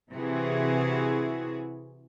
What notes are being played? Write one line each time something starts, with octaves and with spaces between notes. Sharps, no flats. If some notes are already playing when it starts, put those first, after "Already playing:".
C3 E3 E4 F#4 G#4